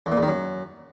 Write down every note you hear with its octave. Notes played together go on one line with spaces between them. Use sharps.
E2
A#2
E2
D#3
F#2